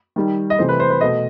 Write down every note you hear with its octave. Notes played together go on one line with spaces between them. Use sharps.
D#3 G3
D#5
C3 E3 A3 C5
B4
C5
B4
B2 A3 D#5